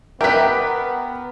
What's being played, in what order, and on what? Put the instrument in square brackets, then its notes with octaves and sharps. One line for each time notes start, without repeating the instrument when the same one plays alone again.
[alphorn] B3 [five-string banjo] G4 B4 [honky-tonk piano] A#4 B6 [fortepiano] E5 G5